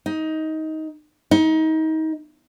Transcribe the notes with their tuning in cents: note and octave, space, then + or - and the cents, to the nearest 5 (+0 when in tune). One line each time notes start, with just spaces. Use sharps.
D#4 +15
D#4 +30